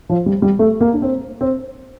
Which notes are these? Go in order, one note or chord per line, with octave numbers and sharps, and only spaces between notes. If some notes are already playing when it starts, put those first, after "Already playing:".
F3
G3
G3
A3
A#3
D4
C4
C4